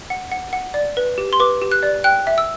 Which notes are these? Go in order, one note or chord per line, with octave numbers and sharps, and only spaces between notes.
F#5
F#5
F#5
D5
B4
G4
C6
B4 D6
G4
F#6
D5
G5 F#6
E5
E6